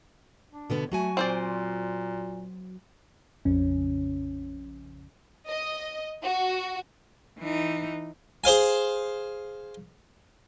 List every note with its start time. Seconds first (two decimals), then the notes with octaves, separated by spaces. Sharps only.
0.52 D4
0.70 B2 D3 B3
0.92 F#3 A3 F#4 G#5
1.17 A#2 C4 C5 D5
3.45 A#1 F2 C#3 C#4
5.49 D#5
6.23 F#4
7.39 E3 D#4
8.44 G#4 C5 F5 G#5